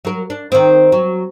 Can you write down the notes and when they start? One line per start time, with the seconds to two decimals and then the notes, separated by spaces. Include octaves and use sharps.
0.05 F#3 A#4
0.30 D4
0.52 D#3 C4
0.92 F#3